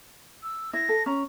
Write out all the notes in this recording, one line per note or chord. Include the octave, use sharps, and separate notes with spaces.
E6
E4 A#6
A4
C#4 A#5